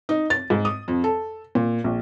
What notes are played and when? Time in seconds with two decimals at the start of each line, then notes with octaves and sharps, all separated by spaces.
0.09 D#4
0.30 A6
0.50 G#2
0.65 D#6
0.88 F2
1.04 A4
1.55 A#2
1.84 A#1